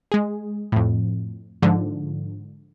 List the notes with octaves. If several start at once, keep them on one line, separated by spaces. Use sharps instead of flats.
G#3 G#4
F2 A2
G#2 D3 F3